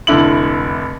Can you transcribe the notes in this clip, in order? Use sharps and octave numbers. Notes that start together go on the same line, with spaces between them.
F1 D3 E4 F#7